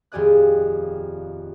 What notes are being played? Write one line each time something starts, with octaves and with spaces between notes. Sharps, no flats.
D#1 F2 G4 G#4 D5 F#6